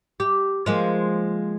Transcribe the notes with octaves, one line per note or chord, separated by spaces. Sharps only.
G4
F3 G#3 A#3